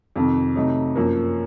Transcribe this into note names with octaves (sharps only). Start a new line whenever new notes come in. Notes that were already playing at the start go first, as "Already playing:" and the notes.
F2 C3 D#3
C3 F#3 A3 D#4
F#2 F3 A#3